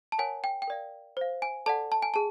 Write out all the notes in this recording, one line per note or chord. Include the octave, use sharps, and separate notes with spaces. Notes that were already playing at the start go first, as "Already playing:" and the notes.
A5
A#4 C#5 F#5 G#5
G5
G5
A#4 D5 F5
C5 F5
G#5
A4 D5 F#5 A5
A5
G#5
G#4 A5